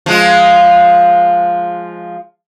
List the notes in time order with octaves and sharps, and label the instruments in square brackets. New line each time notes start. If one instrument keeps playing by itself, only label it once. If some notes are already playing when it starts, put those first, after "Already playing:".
[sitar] F3 G#3 F4